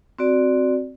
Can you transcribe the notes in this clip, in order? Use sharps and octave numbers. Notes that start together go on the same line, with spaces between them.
C4 F#4 D5